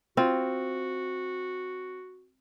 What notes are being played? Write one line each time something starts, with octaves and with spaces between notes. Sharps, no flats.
C4 F4 F#4